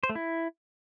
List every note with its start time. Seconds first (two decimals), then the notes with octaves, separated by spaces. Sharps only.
0.03 C5
0.09 A3
0.15 E4